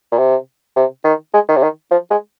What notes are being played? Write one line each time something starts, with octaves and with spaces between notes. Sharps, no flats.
A#2
C3
C3
D#3
G#3
D#3
C3
D#3
F3
G#3